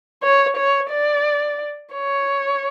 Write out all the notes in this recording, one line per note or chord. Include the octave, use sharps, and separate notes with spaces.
C#5
C#5
D5
C#5